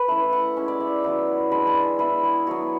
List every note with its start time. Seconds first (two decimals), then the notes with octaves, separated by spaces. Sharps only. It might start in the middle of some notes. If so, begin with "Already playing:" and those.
Already playing: B4
0.08 A3 C#4 E4 E5
0.33 F#5
0.56 G#3 C#4 E4
0.68 D5
0.80 E5
1.04 F#3 B3 E4
1.52 G#3 D4 B5
1.67 A5
1.83 G#5
1.99 G#3 B3 E4 B4
2.23 G#4
2.47 F#3 B3 E4 F#4